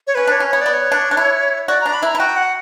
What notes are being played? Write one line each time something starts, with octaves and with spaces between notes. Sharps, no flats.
C#5
C#4 B4
D4 C#5
C#4
B3 C#5
B3 D5
C#5
D4
D4
E4
F#4 D5
D4 A#5
B5
E4
A#5
E4
F#4 G5
F#5